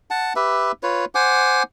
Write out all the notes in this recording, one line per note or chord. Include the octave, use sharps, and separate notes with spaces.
F#5 A5
G4 B4 E5
F4 B4 C#5
C5 F#5 G#5 D6